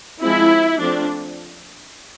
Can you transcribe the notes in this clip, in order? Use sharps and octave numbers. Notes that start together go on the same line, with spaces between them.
F3 G#3 C4 E4
F3 A3 C4 D4